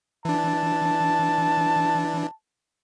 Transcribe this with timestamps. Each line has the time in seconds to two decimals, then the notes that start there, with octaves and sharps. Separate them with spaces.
0.25 E3 D4 A5